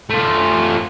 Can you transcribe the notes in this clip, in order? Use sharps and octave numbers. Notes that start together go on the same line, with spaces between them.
A3 F4